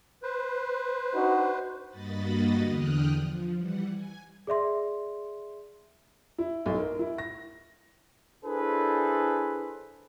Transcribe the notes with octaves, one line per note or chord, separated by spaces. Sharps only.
B4 C5
D4 D#4 F#4
G2 A#3 F#4 D#5 B5 A6
E2 D3 G5 D#6 F6 F#6
F3
E3 G3 F#5
G#5
G#4 D5 E5 C6
E4
B1
A#4
E4
A#6
D4 E4 G#4 A4 B4 C5